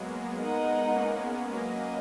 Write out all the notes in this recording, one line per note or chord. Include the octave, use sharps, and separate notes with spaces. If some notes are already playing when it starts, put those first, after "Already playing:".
Already playing: F#3 G#3 A#3 B3
D#4 A#4 D#5 F#5
A#3 C#4
G#3 B3
F#3 A#3 C#4 F#4 B4 D#5